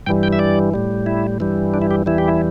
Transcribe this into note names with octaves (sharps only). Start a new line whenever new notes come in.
G2 E3 G3 G5
G5
E5
D5
A2 G3
E4
G2 E3 G3
D4
E4
G4
E2 E3 G3 E4
G4
E4